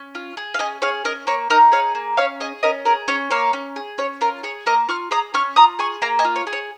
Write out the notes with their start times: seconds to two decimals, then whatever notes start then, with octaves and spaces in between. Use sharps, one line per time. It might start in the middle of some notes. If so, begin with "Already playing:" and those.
Already playing: C#4
0.15 F4
0.37 G#4
0.54 F5
0.59 C#4 D#5 G#5
0.82 G#4 C#5 F5
1.05 C#4 A#4 D#5
1.27 A#3 C#5
1.50 D#4 A#4 D#5
1.72 G#4 C#5 F5
1.95 A#3
2.17 C#4 C#5 F5
2.40 G#4 D#5 G#5
2.63 C#4 A#4 D#5
2.85 G#4 A#4
3.08 C#4 C#5
3.31 A#3 C#5 F5
3.53 C#4
3.76 G#4
3.98 C#4 C#5
4.21 F4 A#4
4.43 G#4 C#5
4.66 A#3 A#4 D#5
4.89 F4 C#6 F6
5.11 G#4 A#5 D#6
5.34 C#4 C#6 F6
5.56 F4 A#5 D#6
5.79 G#4 G#5 C#6
6.02 A#3 F5 A#5
6.19 D#5 G#5
6.24 F4
6.36 C#5
6.47 G#4
6.53 C#5